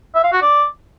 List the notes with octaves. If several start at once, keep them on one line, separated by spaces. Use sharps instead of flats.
E5
F5
F#4
D5